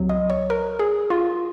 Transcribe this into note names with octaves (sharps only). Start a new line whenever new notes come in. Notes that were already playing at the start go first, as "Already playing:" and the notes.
Already playing: C2 C3 F#3
D#5
C#5
A#4
G#4
F4